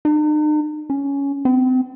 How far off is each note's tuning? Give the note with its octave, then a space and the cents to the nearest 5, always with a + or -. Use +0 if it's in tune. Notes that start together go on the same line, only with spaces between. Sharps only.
D#4 -45
C#4 +10
C4 -35